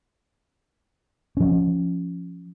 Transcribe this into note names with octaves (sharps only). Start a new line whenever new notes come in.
F3 C#4